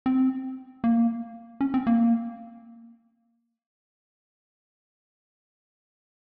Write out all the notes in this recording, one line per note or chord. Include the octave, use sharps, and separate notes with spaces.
C4
A#3
C#4
C4
A#3